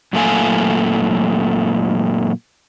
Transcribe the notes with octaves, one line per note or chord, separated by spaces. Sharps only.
F#2 A#2 A3 F5 G#5